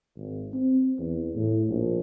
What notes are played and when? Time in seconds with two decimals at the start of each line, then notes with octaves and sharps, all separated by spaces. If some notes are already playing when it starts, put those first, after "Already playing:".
0.16 G#1
0.54 C4
0.98 E2
1.35 A2
1.69 A#1